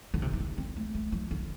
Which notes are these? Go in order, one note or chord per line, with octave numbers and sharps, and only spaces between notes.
D3
C3
E3
D3
C4
A3
A3
F3
D3